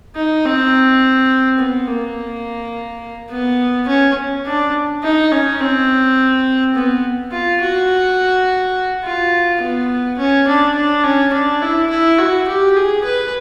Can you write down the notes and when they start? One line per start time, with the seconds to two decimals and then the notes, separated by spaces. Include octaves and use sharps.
0.16 D#4
0.45 C4
1.59 B3
1.87 A#3
3.30 B3
3.88 C#4
4.46 D4
5.03 D#4
5.32 C#4
5.61 C4
6.75 B3
7.32 F4
7.61 F#4
9.04 F4
9.61 B3
10.18 C#4
10.48 D4
10.76 D4
11.04 C#4
11.33 D4
11.62 E4
11.90 E4
12.18 F#4
12.48 G4
12.76 G#4
13.04 B4